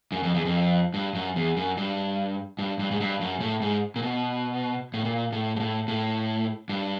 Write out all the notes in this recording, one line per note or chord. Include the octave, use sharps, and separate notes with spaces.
F#2
F2
E2
F2
G2
F#2
E2
F#2
G2
G2
G2
G#2
G2
F#2
A2
G#2
A#2
B2
A2
A#2
A2
G#2
A2
A2
G2